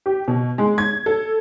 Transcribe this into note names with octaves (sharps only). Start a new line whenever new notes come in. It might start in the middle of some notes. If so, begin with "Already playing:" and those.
G4
B2
G#3
G#6
A4